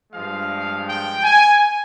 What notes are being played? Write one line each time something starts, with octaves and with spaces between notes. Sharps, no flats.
G2 F3 G#3 F5
G5
G#5